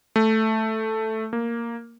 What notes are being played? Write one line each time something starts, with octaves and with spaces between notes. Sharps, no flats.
A3
A#3